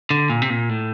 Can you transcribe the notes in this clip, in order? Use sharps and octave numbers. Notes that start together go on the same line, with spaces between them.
D3
A#2
C3
A#2
A2